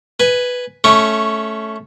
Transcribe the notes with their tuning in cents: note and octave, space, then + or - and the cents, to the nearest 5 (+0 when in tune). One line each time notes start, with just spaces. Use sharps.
B4 +0 G#5 +0
A3 -10 C#4 +5 C#6 +0